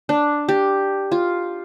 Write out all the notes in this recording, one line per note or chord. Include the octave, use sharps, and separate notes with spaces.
D4
G4
F4